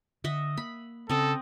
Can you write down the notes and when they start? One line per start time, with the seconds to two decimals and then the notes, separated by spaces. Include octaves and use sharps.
0.24 D3 D#5 E5 F#5
0.57 A#3 B5
1.10 C#3 C4 A4 D#5 F#5